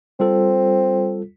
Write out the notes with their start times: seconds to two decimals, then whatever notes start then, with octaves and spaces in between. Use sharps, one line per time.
0.20 G3 C4 F4 A4